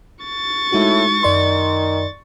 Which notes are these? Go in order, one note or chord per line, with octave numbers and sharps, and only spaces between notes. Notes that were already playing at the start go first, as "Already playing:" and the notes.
C#6 A6
A2 G#3 D#4 F#4
F#2 D#3 D5 C6